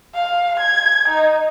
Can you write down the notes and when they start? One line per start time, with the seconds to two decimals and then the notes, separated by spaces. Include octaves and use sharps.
0.14 F5
0.59 G#6
1.08 D#4